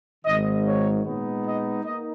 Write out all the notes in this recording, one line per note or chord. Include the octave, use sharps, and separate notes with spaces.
G#1 G#2 D#3 D#5
C#5
A#2 G#3 B3 D#4
D#5
A#3 D#4 D#5